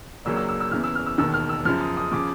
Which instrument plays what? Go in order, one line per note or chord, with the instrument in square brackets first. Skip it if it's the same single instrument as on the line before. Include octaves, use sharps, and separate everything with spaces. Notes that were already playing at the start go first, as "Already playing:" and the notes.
[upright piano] C#2 C#3 F#3 A#3 D4 E6
E6
E6
E6
E2 C#3 E3 F6
E6
F6
E6
E1 D#2 D#3 E6
F6
E6
F#2 C#3 F3 F6
D#6
D#6
C#3 F3 D6